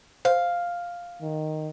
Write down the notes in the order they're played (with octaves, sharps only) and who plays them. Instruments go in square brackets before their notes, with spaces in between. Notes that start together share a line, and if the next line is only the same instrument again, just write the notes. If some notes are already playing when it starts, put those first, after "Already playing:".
[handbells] C5 [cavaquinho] F5
[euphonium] D#3